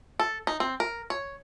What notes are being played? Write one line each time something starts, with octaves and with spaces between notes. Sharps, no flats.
A4
D#4
C4
A#4
C#5